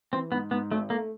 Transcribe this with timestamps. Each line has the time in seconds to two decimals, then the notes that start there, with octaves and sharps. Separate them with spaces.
0.13 E3 C4
0.32 G#2 B3
0.51 G#2 B3
0.71 G#1 A3
0.90 A3 A#3